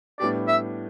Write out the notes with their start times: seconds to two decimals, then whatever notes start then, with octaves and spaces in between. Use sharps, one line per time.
0.19 A2 G3 B3 D4 G4 D5
0.48 E5